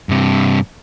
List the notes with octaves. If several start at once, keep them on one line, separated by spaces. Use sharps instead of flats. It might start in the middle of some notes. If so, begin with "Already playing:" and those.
G2 C3